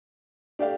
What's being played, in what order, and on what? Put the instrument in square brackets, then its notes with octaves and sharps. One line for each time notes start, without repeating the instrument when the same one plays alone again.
[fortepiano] A3 D4 G4 D5 F5